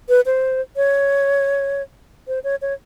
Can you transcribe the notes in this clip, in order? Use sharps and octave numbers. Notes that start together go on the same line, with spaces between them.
B4
C5
C#5
C5
C#5
C#5